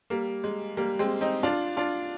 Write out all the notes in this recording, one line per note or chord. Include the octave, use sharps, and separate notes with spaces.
G3 A#3
G#3
G3 A#3
G#3 C4
C4 D#4
D4 F4
D4 F4